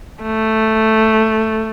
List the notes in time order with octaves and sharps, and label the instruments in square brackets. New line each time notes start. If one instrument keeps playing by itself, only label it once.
[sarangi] A3